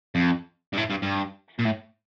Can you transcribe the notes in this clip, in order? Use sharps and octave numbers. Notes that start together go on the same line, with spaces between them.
F2
G2
A2
G2
G2
A#2
A2